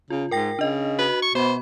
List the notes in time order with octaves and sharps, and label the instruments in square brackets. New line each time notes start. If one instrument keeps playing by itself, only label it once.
[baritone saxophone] C#3 [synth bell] F4
[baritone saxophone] G#2 [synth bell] A#4 G5 A#6
[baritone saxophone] C#3 [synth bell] D4 D#5
[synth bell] F#4 [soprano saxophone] B4
[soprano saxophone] C#6
[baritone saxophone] B2 [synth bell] B3 F#4 B5 [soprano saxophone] C5